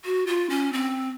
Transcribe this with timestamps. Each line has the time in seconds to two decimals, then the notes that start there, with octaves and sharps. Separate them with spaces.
0.05 F#4
0.27 F4
0.50 C#4
0.73 C4